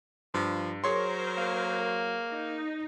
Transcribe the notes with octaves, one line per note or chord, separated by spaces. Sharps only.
G2 F3
F#3 G#4 A#4 C5 C#5 C6
A#3
D#4